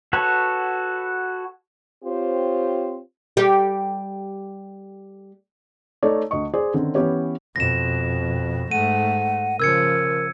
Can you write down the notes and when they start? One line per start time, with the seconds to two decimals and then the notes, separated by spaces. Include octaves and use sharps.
0.13 F#4 A4 B4 C#5
2.04 C4 F4 G4 C5 C#5
3.37 G3 G4
6.03 A3 D#4 A4 C#5 D5
6.31 D2 D#5 C#6
6.54 G#4 C5 D5
6.74 D3 D#3 C4 C#4
6.95 E3 B3 C#4 G4 C#5
7.56 F2 B2 A#6 E7
8.71 G#2 A3 F#5 D#7
9.60 C#3 F3 A#4 E6 G#6 C#7